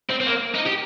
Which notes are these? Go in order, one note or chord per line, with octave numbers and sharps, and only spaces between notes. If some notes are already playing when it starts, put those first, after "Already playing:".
C4
C4
A#3
D#4
G4